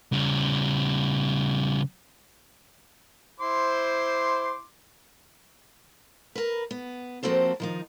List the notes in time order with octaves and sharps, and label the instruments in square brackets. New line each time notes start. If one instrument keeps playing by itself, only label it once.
[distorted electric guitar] C#3 G3
[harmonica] E4 C6 D6 [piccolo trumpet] C5
[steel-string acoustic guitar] A#4 B4
B3
F3 A#3 C4 F#4 A4 C5
D#3 F3 D#4